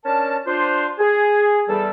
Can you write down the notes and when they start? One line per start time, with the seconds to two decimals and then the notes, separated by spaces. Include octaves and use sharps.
0.05 C#4 D4 A#4 A5
0.46 D4 F4 C5
0.98 G#4
1.68 E2 G3 A4